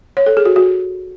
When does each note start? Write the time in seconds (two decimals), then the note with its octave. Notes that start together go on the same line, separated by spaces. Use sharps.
0.17 C#5
0.26 A4
0.37 G#4
0.46 F#4
0.56 F#4